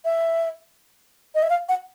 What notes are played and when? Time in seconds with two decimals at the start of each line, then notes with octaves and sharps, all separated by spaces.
0.05 E5
1.35 D#5
1.43 E5
1.50 F5
1.69 F#5